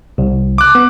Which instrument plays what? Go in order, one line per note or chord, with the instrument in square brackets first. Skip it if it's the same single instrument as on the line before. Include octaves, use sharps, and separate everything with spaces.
[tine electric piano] C2
[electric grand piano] D6 F#6
[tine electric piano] B3